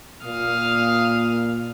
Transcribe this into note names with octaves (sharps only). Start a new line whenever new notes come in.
A#2 F5 D#6 F6